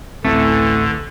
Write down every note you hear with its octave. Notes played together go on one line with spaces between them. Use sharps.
A1 D2 D3 E3 A3 C4